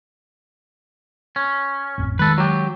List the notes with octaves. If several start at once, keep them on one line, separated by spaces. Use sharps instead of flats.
C#4
A1 F2
D#3 G#3 A4 B4
F#3 G4